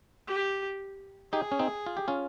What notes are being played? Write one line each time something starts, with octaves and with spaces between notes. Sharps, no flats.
G4
D#4 G4 G#4
C#4
C4 D#4
F4
G4
C#4 F4